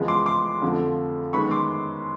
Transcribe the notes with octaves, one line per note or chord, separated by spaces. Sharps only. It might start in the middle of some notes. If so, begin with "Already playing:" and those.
Already playing: E2 C#3 F3 G#3 B3
C6 D6
C6 D6
F2 D3 F3 A3
F#2 D#3 G#3 B3 B5 C#6
C6 D6